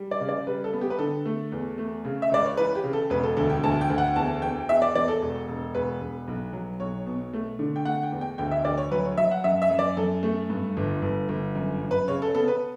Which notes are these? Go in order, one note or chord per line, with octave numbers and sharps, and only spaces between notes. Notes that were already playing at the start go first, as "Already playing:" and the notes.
Already playing: G3
D5
C#3
D5
G3 B4
A4
B3
G4
B4
D3 A4
A3
E2
A3
C#3
E5
C#2 D5
C#5
E3 B4
G4
C#3
A4
E1 B4
A4
D2 A4
G5
D2 A5
G5
D2
F#5
E2 A5
E2 G5
E2 E5
D5
E2 D5
A4
E1
E1
E1 B4
E1
B1
F#3
B1 C#5
B2
A3
D3
G5
A3 F#5
G5
E2
G5
D2 G5
E5
D2 D5
C#5
F#3 B4
C#5
F#3 E5
F#5
F#2 E5
E5
F#2
D5
F#2 A4
A3
G2
G1
G1
G1
F#2
F#2
B4
C#3 C#5
A4
B3 A4
B4